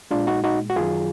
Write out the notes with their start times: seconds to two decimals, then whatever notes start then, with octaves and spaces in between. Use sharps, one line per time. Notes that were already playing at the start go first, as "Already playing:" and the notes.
0.11 A#2 G#3 D4 F4
0.27 D#4 F#4
0.44 D#4 F#4
0.70 F#4
0.76 F#2 D#3 F#3 F4 G#4